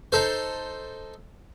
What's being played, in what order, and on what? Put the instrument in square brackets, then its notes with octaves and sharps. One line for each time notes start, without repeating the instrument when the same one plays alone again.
[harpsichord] D#4 A4 C5